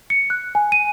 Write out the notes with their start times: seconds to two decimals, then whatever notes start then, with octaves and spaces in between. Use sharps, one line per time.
0.10 C#7
0.30 F#6
0.55 G#5
0.72 D#7